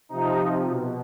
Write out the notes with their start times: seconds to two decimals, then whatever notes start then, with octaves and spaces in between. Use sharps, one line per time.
0.09 C3 F3 D#4
0.38 C3 F3
0.67 B2